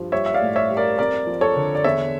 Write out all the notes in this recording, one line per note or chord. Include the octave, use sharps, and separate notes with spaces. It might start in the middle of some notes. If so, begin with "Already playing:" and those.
Already playing: G2 F3
G3 C#5 E5
E5
D5 F5
A2
C#5 E5
G3
A#4 D5
F2 A#4 D5
F3
A4 C#5
D3
D5
E2 C#5 E5